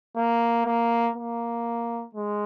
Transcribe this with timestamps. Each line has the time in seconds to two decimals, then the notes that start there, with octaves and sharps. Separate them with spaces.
0.16 A#3
0.66 A#3
1.16 A#3
2.15 G#3